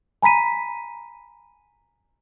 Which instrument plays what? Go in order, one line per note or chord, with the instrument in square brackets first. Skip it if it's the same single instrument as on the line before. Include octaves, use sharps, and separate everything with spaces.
[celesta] G#5 A#5 B5 B6 D#7